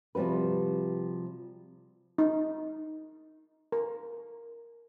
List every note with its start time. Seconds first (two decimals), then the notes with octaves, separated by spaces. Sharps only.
0.15 C3 F3 G3 F#4 B4
2.18 D#4
3.72 A#4